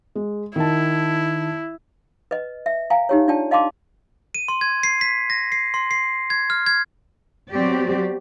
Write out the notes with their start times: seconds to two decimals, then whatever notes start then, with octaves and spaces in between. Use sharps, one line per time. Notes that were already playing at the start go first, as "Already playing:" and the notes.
0.15 G#3
0.56 D#3 E4 A5
2.31 B4 D#5
2.66 E5
2.90 F5 G#5 A#5
3.09 D#4 G4 C#5
3.28 D4 F4 D5 G5 A5
3.51 D#5 F5 A5 C6 D6
4.35 D#7
4.48 C6
4.61 G#6
4.83 C7
5.01 B6
5.30 A#6
5.52 C7
5.74 C6
5.91 C7
6.30 G#6
6.50 F6
6.66 G#6
7.51 F#3 B3 C4 F#4 G4 D5